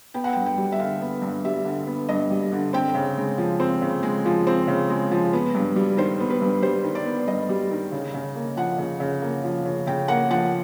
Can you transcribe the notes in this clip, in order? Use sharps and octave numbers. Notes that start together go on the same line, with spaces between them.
B3 G5
F#5
G2 G5
G5
G3
E5
D3 F5
B3
G2
G3 E5
D3
B3
G2 D#5
G3
D3
C4 G5
C#3
G#3
F3
C4
C#3
G#3
F3
C4
C#3
G#3
F3
B3
G2
G3
D#3 C5
B3
B4
G2
G3 C5
D#3
D5
B3
G2 D#5
G3
D#3
C#3
C#3
A#3
F3 F#5
C#3
C#3
A#3
F3
C#3
C#3 G5
A#3 F#5
F3 F#5